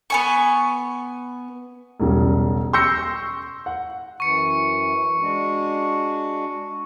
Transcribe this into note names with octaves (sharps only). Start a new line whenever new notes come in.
B3 G#5 C#6
E1 B1 C#3 G3
C6 C#6 E6 G6 A#6 C#7
F#5
F#2 E3 C#6 C#7
G#3 D4 F#4